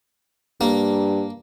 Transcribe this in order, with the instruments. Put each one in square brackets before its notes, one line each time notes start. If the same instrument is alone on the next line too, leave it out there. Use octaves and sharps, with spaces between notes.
[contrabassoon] G2 [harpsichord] A#3